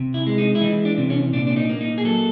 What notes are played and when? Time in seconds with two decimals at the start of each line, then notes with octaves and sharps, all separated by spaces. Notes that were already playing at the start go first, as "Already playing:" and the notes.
Already playing: C3
0.14 E4
0.27 G#3
0.38 D#4
0.55 E4
0.62 E3 D#4
0.85 D4
0.98 C3
1.10 C#4
1.33 A#2 D4
1.47 D4
1.56 D#4
1.69 A#3
1.81 D#4
1.98 G#4
2.05 F#3 A4